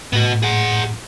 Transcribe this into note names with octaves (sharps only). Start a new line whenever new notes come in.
A2 B3 F#4
G#4 F#5